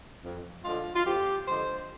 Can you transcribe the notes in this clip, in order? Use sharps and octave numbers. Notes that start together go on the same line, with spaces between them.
F2
D3 F3 G#3 F4
F4
F2 G4
D3 F3 G#3 C5